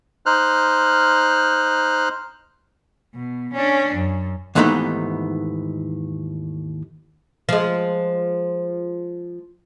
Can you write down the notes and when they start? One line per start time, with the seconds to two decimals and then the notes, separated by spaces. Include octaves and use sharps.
0.26 D#4 C5 F6 F#6
3.14 B2
3.53 C#4 D4
3.95 F#2
4.55 D#2 G#2 E3 A3 B3 D#4
7.49 F3 G#3